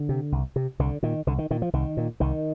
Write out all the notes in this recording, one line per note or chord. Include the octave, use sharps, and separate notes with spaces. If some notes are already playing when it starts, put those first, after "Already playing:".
Already playing: D3
C3
C2
C3
C2 D3
A#2 D#3
C2 D3
D#3
A#2 D#3
F3
C2 D#3
A#2
C2 D#3